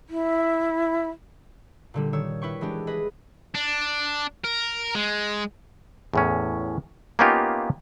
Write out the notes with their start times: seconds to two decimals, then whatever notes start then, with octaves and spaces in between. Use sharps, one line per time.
0.09 E4
1.94 A#2 D3 G3
2.13 D#3 C#5 E6
2.42 E4 B4 G5 C#6
2.61 E3 G#3 D4 G4
2.87 G#4 B4 D#5
3.54 D4
4.44 A#4
4.95 G#3
6.14 E2 A2 C#4
7.19 A#3 B3 C#4 D#4 F4 G4